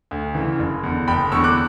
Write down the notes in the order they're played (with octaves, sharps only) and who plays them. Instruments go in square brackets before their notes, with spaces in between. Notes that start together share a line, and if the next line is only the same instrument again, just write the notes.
[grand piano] D2
C#3 E3
F#1
E2 D3
F#1 G5 B5
E2 D3 C#6 E6
D6 F#6